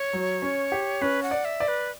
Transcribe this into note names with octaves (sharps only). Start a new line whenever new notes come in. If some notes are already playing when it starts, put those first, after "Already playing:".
Already playing: C#5
F#3
C#4
G4
C#4 B4
F#5
D5
E5
D5
B4